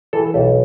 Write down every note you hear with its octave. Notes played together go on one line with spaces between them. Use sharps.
E3 A4
B1 G4